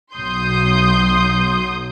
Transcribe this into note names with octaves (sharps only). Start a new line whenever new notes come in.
B1 F#3 C6 D#6 G6